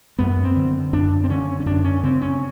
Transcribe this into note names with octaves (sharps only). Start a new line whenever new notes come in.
F#2 B3
C4
D3
F#2 D4
C4
D3 C#4
C#4
F#2 D4
C#4
C#3 C4
C#4